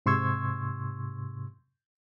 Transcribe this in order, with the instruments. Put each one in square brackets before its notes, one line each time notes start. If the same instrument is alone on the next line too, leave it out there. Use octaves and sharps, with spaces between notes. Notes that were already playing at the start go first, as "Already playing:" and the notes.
[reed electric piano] G#2 C3 C6 C#6 E6 G#6